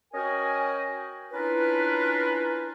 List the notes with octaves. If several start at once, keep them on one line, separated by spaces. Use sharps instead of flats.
C#4 F#4 A#4 D#5 G5 G#5
C#4 D4 E4 F4 A#4 B4